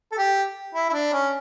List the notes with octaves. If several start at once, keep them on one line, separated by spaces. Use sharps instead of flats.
A4
G4
E4
E4
D4
C#4